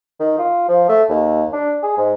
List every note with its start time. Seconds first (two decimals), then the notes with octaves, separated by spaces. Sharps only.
0.20 D#3
0.38 F4
0.68 F3
0.89 A3
1.10 D#2
1.53 D4
1.83 G#4
1.98 G#2